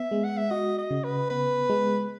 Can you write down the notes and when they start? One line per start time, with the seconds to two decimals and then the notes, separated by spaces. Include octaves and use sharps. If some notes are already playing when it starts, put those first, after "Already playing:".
Already playing: B3 E5
0.12 G#3
0.24 F#5
0.38 E5
0.51 F#4 D#5
0.78 D#5
0.91 C#3
1.04 B4
1.30 B3 B4
1.70 G#3